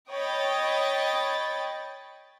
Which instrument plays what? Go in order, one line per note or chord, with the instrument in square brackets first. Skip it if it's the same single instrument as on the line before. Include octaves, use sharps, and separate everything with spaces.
[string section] C#5 D#5 G5 B5 A6